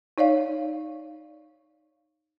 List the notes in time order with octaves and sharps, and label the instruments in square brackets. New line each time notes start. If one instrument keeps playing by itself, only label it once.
[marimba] D#4 C#5 D5 F5